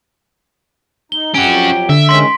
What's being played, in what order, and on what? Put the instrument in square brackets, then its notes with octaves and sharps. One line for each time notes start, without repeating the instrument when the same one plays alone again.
[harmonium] D#4 [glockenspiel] G7
[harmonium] F2 F#3 G4 [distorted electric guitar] C#4 F#4 [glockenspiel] D7
[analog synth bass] D3 [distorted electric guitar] E5
[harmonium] D#3 G#3 C#4 [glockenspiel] C6 B6